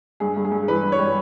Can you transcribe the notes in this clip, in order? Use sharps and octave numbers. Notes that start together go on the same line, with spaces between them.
G2 G#4
G2
G#4
G2
E3 B4
G2
C#5
G3